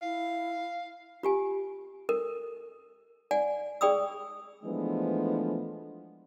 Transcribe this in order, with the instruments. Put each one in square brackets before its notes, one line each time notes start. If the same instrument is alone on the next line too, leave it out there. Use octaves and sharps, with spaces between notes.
[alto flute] E4 [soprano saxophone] F5
[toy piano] F4 G4 G#5
A4 A#4
D5 F#5 G#5
G#4 D5 G5 B5 D#6 E6
[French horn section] E3 F3 G#3 A3 B3 D4